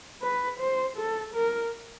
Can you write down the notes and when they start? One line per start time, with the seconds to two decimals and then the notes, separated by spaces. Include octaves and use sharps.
0.22 B4
0.59 C5
0.97 A4
1.34 A#4